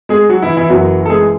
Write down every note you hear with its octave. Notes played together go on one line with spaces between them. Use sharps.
G#3 G#4
F#3 F#4
E3 E4
E3 E4
F#1 F#2 E3 F#3 F#4
A4
G#3 G#4